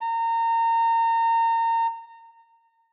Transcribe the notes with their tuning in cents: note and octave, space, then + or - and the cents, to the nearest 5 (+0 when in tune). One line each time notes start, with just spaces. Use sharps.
A#5 -30